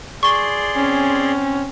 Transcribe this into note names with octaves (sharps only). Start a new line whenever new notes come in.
G#4 D5 C6 C#6 G7
C4 C#4